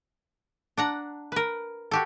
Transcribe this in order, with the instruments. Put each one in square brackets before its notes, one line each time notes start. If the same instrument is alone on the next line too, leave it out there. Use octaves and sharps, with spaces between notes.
[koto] D4 F#5 A#5
A#4 B4
F#4 G4 A4